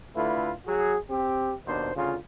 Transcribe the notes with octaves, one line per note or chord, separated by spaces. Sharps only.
D3 A3 E4 F4 B4
F#3 F#4 G#4
C4 G4
D#2 B2 D4 C5
D2 C#3 F4